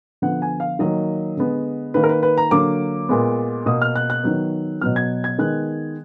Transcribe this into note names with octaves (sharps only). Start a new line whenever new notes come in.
D3 F3 B3 F#5
G#5
F5
D#3 F#3 A#3 D#5
D3 G#3 B3
D#3 A#3 B4
A#4
B4
B4
A#5
D3 F#3 A#3 D6
A#2 G#3 B3
B2 A#3 D#6
F6
F#6
F#6
D#3 F#3 B3
B2 F#3 B3 F6
G#6
G#6
D#3 G#3 B3 F#6